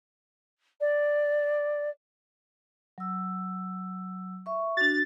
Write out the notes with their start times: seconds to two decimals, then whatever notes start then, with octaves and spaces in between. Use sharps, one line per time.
0.80 D5
2.98 F#3 E6
4.46 E5 C#6
4.77 D4 F#4 A6